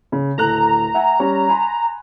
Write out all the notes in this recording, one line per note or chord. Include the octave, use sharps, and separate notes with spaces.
C#3
D1 A4 A#5 F#6
E5 F#5 G#5
G3 C#4
G#5 B5 C6